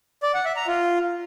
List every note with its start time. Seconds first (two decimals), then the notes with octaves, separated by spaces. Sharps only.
0.23 D5
0.34 F#5
0.45 E5
0.56 A#5
0.68 F4